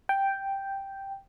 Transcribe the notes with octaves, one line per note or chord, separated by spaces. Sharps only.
G5